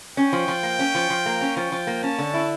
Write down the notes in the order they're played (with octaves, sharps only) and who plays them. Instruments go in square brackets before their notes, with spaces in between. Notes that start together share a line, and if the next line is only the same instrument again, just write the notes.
[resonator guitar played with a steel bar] C#4 [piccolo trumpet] G5
[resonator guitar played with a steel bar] F3
F3
A#3
C#4
F3
F3
A#3
C#4
[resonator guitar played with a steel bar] F3 [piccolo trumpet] G5
[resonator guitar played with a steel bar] F3
A#3
[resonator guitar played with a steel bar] C#4 [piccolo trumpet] A5
[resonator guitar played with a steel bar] D3
E4